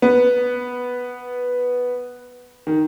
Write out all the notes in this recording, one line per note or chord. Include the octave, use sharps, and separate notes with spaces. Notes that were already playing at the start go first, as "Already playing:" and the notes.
B3
D#3